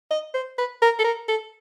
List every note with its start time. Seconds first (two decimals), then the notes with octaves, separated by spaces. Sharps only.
0.11 D#5
0.34 C5
0.58 B4
0.82 A#4
0.99 A4
1.04 A#4
1.28 A4